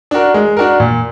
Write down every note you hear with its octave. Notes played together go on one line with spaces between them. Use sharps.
D4 F#4 A#4
G#3
D4 F#4 A#4
A#2